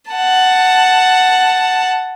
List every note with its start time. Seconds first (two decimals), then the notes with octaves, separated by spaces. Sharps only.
0.11 F#5 A5